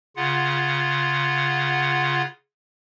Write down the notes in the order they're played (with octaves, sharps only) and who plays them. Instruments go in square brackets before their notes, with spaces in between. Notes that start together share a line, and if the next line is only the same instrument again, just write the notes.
[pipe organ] C#3 F4 F#5